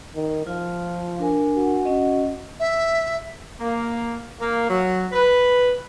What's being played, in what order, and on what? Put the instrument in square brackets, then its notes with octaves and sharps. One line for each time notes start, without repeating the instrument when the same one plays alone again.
[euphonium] D#3
[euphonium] F3 [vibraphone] F4
[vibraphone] D4 A#4 G#5
[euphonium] F#4
[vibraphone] C#4 D#5
[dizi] E5
[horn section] A#3
A#3
F#3
B4